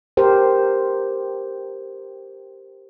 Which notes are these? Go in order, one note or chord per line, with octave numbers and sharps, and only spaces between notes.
G4 A#4 C5